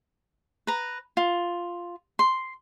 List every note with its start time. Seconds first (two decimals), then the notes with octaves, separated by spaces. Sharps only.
0.67 B4 A#5
1.17 F4
2.19 C6